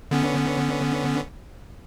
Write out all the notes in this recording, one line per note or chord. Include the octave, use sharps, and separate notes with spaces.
D3 B3 C#4